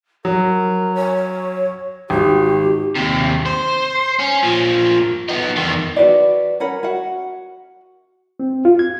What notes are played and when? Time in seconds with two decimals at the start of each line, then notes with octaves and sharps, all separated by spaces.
0.25 F#3 A#4
0.95 C#5
2.10 G#1 F#4 G4
2.95 D#2 C3
3.46 C5
4.19 C#4
4.43 A#2 F3
5.29 B3 D#4
5.56 E2 D#3
5.96 F#4 B4 D5
6.60 C#4 A#4 F#5 B5
6.83 F#4 F#5
8.40 C4
8.65 F4
8.79 G#6